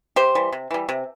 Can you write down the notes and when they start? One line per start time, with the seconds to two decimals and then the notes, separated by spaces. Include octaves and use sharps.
0.16 C3 G4 C5
0.35 E3 G3
0.52 C3
0.71 E3 G3
0.89 C3